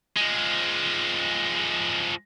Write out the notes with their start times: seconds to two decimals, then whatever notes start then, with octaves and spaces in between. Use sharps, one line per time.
0.16 F3 G#3